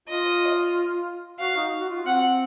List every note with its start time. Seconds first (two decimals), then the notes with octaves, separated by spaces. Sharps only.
0.08 F4 D#5
1.39 F#4 F5
1.56 D#4
1.81 F#4
1.89 F4
2.06 C4 F#5